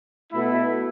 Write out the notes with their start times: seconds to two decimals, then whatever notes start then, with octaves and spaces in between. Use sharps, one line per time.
0.33 B2 A3 E4